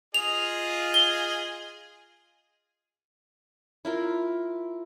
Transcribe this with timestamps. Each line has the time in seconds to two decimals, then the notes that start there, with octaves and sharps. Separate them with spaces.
0.14 F4 G#4 D#5 F7
0.94 G7
3.85 E4 F4 A#4